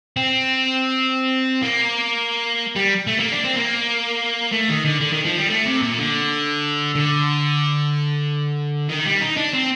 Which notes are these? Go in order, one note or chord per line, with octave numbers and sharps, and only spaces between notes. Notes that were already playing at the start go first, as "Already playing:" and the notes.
C4
A#3
G3
A3
A#3
D4
C4
A#3
A3
D#3
D3
D3
D#3
F3
G3
A3
C3
A#2
D3
D3
D#3
G3
D#4
D4
C4